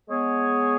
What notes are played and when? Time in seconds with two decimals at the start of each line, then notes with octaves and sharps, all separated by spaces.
0.08 G#3 B3 G#4 C#5